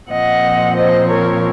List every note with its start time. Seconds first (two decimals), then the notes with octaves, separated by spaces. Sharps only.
0.10 A#2 F3 C4 D#5 F#5
0.75 C5 D#5
1.08 A#4 C#5